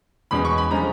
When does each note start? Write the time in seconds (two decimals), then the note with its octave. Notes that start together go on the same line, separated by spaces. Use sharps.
0.31 E2 B2 G#3 C#4 B5
0.45 C#6
0.58 B5
0.71 D3 F3 G#3 C#4 A#5